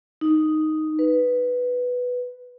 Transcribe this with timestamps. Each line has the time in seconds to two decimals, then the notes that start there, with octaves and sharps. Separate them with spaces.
0.21 D#4
0.99 B4